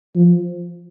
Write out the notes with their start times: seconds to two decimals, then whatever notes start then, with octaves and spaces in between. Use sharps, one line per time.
0.16 F3